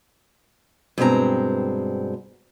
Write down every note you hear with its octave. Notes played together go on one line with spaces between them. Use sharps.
G2 B2 G#3 C4 A#5